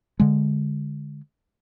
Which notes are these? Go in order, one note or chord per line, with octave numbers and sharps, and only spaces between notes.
D3 G#3